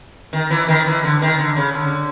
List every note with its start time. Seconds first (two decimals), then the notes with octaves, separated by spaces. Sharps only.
0.33 D#3
0.50 E3
0.68 D#3
0.86 E3
1.03 D3
1.22 D#3
1.39 D3
1.56 C#3
1.74 D3